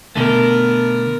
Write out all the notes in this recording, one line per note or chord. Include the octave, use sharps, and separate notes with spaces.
B2 D3 A3 B3 A#4